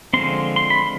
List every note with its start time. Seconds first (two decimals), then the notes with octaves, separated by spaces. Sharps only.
0.13 D3 F3 G#3 C4 C6
0.56 C6
0.70 B5